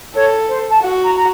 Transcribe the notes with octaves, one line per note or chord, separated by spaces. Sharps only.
A4 C#5
C5
A5
F#4 F#5
A#5
A#5